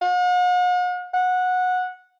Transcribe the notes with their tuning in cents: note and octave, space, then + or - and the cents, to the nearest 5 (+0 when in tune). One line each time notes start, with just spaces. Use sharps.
F#5 -45
F#5 -15